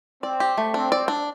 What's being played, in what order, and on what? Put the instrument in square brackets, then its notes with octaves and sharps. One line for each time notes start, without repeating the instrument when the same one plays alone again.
[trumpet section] C4 [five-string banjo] D5
[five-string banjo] G4
A3
[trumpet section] C4 [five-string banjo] D4
[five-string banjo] D5
D4